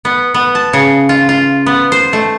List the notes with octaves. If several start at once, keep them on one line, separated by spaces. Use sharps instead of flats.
B3
B3
A5
C#3
F4
F4
B3
C5
A3